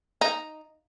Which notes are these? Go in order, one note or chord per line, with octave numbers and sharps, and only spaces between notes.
D#4